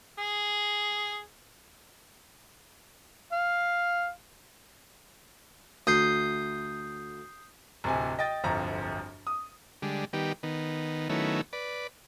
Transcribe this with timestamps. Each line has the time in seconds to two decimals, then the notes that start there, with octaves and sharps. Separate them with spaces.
0.18 G#4
3.32 F5
5.87 D2 D#6 G6 C7
7.84 D1 C3 G#5
8.19 D#5 G5 A6
8.44 D1 G1 F2 A#5
9.27 D#6
9.82 D3 G3 G#3
10.13 D#3 G3 B3 G4
10.43 D#3 B3
11.09 D#3 F#3 A3 B3 C#4 E4
11.53 B4 D5